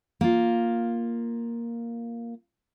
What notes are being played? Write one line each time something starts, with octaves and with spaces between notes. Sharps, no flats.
A#3 F4